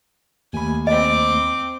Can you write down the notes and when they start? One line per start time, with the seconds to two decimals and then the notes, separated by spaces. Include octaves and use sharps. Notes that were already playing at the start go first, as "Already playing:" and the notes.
0.53 D#2 A3 G#5 B5
0.87 C4 D#5 D6